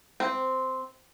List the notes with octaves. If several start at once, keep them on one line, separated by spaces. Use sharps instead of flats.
C4